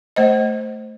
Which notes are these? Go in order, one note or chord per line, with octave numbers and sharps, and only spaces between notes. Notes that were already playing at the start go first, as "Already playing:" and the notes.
A3 C5 D#5